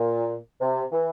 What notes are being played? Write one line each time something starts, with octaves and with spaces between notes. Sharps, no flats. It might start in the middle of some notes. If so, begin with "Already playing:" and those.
Already playing: A#2
C3
E3